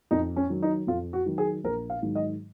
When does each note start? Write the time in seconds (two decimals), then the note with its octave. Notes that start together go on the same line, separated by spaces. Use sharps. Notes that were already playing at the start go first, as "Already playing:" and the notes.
0.11 F2 D#4
0.36 C#4
0.50 D#3 F#3
0.62 D#4
0.87 F2 F4
1.13 F#4
1.26 D#3 F#3
1.38 G#4
1.64 A#1 A#4
1.90 F5
2.02 G#2 D#3 F#3
2.15 D#5